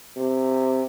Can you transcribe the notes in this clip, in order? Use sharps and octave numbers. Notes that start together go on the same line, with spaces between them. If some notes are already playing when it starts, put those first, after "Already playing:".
C3